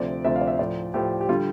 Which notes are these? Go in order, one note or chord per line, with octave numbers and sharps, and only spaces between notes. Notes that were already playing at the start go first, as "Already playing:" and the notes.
Already playing: D2 C3 F3 D5
D2 C3 F3 E5
F5
D5
E5
A2 F3 D5
A2 F3 G4
G4
D3 G3 F4